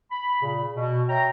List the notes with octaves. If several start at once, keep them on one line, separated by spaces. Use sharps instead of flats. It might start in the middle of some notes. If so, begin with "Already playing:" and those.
B5
A#2 C#3
B2
C#5 E5 G5 A#5